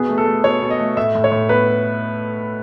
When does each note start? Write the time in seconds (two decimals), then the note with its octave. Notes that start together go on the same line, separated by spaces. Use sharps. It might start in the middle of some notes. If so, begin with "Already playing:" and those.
Already playing: B2 B3 G#4
0.09 A3
0.18 A4
0.26 A3
0.44 B2 C#5
0.62 B2
0.70 D#5
0.80 A3
0.97 A2 E5
1.15 A2
1.24 C#5
1.32 A2
1.49 B3 B4